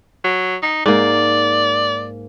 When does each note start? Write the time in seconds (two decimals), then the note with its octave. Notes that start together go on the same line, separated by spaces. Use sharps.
0.24 F#3
0.62 D#4
0.86 G#2 A#3 D5